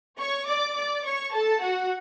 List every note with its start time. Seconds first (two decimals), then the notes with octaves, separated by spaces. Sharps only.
0.19 C#5 C#6
0.47 D5 D6
0.76 D5 D6
1.04 C#5 C#6
1.33 A4 A5
1.61 F#4 F#5